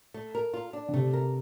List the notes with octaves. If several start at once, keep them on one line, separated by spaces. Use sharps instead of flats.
A3
A#4
F4
D4
D3
C3 A3
A#4